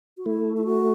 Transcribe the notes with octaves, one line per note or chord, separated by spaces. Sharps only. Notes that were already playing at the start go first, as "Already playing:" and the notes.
F#4
A3 E4
E4
F#4